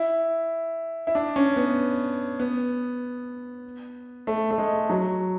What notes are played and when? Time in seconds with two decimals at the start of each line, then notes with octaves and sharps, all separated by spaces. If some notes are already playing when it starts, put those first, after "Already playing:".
Already playing: E4
1.07 E4
1.15 D4
1.36 C#4
1.56 B3
2.39 B3
4.27 A3
4.51 A3
4.58 G#3
4.90 F#3